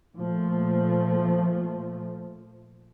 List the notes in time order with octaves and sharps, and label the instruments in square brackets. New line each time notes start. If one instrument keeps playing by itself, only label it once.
[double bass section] A#2 F3 A3